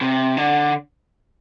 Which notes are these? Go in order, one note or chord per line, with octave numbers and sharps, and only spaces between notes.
C3
D3